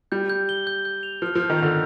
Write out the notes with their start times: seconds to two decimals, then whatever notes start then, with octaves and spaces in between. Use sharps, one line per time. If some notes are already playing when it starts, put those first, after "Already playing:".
0.12 G3 G6
0.29 G6
0.49 G7
0.67 G6
0.85 G6
1.03 F7
1.22 F3 F6
1.35 F3
1.40 F6
1.50 D#3
1.59 D3 F7